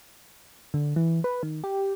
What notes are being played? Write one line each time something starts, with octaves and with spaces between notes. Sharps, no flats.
D3
E3
B4
D#3
G4